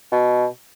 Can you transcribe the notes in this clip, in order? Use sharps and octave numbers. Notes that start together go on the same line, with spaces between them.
B2